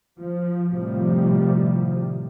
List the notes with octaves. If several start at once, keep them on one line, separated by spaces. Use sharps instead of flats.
F3
A2 C3 D#3 F3 G3